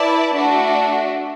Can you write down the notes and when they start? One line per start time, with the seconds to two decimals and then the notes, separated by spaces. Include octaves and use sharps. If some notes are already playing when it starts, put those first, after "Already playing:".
Already playing: E4 B4 D5 A5
0.36 A3 D4 F#4